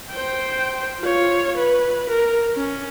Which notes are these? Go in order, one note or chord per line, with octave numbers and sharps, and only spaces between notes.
C5 G5
F4 C#5
B4
A#4
C#4